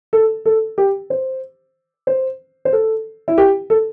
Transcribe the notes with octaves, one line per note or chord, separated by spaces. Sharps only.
A4
A4
G4
C5
C5
C5
A4
E4
G4
A4